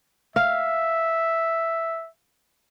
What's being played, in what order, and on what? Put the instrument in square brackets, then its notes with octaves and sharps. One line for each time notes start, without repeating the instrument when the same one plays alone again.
[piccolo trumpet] E5 [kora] F5